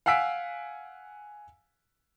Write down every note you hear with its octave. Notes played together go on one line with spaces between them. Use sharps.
F5 F#5 G#5 E6 B6 D7